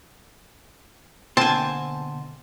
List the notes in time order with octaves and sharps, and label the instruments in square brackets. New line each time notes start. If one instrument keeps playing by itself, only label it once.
[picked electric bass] B2 [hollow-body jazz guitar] D3 A#3 C5 [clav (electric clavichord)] C4 [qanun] G#5 A5